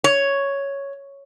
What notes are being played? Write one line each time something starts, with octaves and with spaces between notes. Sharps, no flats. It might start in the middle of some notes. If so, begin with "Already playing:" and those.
C#5